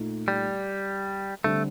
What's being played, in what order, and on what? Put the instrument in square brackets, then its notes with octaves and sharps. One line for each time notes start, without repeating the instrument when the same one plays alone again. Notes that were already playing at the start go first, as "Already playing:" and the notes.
Already playing: [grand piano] A#2 A3 D#4
[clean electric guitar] G3
[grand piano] D3 G3 C4 [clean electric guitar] A3